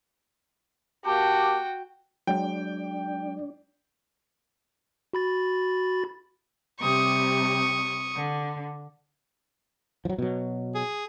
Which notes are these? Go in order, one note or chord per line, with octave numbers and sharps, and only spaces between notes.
A#3 F#4 G4 G5 A5
F#3 G#3 D4 G5
F#4 B5 A6
C3 G3 C#6 D#6
D3
F3 F#3
B2 F#3
G#4